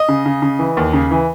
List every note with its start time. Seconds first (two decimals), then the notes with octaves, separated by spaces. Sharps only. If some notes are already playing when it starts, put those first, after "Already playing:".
Already playing: D#5
0.08 C#3
0.26 C#3
0.42 C#3
0.59 E3
0.77 D#2
0.93 C#3
1.11 E3